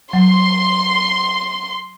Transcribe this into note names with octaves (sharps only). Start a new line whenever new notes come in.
F#3 C6